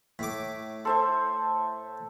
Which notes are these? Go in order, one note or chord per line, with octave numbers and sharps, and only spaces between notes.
A2 D6 B6
A4 C5 E5 C6